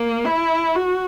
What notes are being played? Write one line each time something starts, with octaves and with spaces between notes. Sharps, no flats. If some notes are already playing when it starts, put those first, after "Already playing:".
Already playing: A#3
E4
F#4